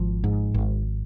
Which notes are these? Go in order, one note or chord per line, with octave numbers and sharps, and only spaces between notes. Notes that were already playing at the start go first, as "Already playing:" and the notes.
Already playing: G#1 F3
G#2
G#1